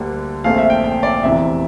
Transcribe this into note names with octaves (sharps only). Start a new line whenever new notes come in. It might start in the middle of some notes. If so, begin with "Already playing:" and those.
Already playing: D2 D3 G3 A#3
A#1 A#2 A3 C4 F5
E5
G5
G5
D5
F1 E2 C3 E3 E5